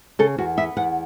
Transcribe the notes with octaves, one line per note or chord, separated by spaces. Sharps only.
C#3 A4
E2 F#4
B3 E5
E2 F#5